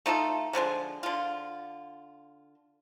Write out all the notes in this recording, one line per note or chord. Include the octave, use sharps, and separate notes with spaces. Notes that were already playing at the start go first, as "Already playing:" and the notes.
A3 D#4 F4 A4
D3 F3 F#3 G#3
D3 F4